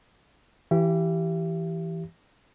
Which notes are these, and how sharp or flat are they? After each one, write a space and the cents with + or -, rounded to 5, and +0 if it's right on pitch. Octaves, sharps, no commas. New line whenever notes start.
E3 +0 G4 -15 E5 +40